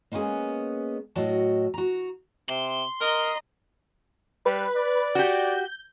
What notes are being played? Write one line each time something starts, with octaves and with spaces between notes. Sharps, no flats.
G#3 A#3 B3 C#4 G#4
A2 F#3 F#4 D#5 A5
F#4 A#5
C3 C6
A#4 D#5 A#5
G3 B4
D5
F#4 G4 G6